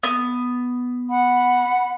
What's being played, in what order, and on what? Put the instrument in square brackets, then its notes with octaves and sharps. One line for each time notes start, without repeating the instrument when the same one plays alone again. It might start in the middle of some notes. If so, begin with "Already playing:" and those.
[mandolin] B3
[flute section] F#5 B5